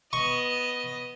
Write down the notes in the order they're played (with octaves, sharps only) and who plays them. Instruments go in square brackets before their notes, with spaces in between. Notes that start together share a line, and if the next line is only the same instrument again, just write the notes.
[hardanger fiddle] B3 D#5 [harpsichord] C#6